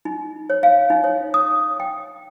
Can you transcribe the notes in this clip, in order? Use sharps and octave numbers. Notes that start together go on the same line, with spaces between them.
D#4
C#5
F5
D#4
C#5
D#6
G5